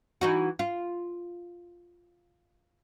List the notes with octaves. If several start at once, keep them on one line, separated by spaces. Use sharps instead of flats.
E3 D#4 F#4
F4